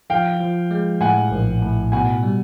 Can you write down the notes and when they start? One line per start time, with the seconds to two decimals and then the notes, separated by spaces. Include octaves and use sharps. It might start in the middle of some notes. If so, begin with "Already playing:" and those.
0.10 F3 F5 G5
0.40 F3
0.71 G#3
1.01 A2 F#5 G#5
1.31 A#1
1.61 A2
1.92 B2 F#5 G#5
2.23 G3